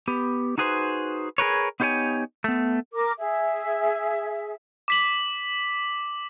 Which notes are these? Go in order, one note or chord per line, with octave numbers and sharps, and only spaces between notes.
B3 G4
D#4 F#4 G#4 B4 C5
G#4 A#4 B4 C#5
B3 D#4 G4 C5 C#5 G#5
A3 B3
A#4 D6
G#4 E5
D6 B6 F#7